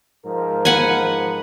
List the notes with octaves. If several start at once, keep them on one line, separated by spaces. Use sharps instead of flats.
G#2 F3 A#4
B4 F#5 G#5